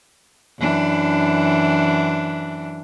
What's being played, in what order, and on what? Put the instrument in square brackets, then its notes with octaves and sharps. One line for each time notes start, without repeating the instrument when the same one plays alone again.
[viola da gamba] F#2 E3 D4